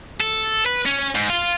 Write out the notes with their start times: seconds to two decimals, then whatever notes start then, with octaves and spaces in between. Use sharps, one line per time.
0.21 A4
0.66 B4
0.86 C#4
1.15 G#2
1.30 F4